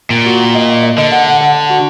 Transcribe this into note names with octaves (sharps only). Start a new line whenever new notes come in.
A#2 G5
F#4
G5
D#5
G5
D#5
D3 D#5
F#5
F#5
F#5
F#5
F#4